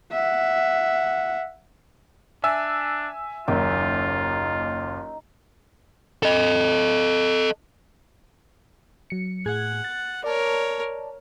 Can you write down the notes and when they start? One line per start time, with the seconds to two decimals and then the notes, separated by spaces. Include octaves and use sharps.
0.12 E5 F#5
2.44 D4 E5 G#5 E6
3.48 F#1 D#2 D#4 F4
6.23 A4 D#5
9.10 F#3 C#7
9.46 A2 G#4 F#5 G#6
9.84 A6
10.24 A#4 C#5 D5 A5